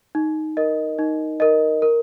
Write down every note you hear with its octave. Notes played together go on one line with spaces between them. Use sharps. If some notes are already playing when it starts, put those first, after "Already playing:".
D#4
A#4 D#5
D#4
A#4 D#5
A#4